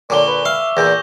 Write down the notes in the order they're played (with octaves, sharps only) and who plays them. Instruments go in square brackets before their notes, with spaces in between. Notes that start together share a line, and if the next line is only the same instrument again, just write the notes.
[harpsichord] A#2 D3 [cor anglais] C#5 [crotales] C#6 D6 G7
[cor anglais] B4
[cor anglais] E5 [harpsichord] F5
[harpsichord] E2 A#2 [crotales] E6 G6 A#6